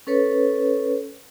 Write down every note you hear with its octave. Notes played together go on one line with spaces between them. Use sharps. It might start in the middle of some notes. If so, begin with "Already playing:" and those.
C#4 A4 B4 C#5